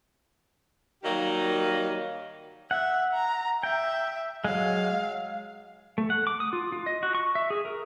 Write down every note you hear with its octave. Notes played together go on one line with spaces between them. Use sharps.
D#3 F#3 G3 A#3 G4 D#5
E5 F#5
A#5
E5 G5
F#3 G#3 F5
A3
F#5
D6
D#6
F4
F4
D#5
F#4
C#6
E5
G#4
A#4